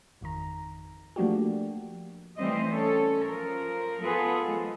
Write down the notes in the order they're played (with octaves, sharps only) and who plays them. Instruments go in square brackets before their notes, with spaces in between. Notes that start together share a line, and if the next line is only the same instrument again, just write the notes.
[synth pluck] G#1 F2 D#3 A#5
F3 A3 A#3 D4 F#4 G4
[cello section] E3 G3 A3 C4 C5 D#5
C#4 A4 C#5
F3 A#4
B3 F4 G#4 A4 B4
F3 G#3